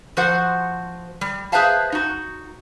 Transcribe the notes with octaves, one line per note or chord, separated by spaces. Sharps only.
F3 F#4 C5 F#5
G3
G#4 B4 C5 E5 F5 A5
D#4 F#4